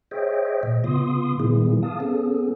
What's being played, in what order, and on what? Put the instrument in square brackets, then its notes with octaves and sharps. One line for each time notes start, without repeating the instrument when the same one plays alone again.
[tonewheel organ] G#4 C5 C#5 D#5 E5 G5
A#2 D#5
C#3 B3 F4 C6 D#6
A#2 D#3 G3 B3 E4 G#4
F5 A5 D#6
B3 C#4 G#4 A4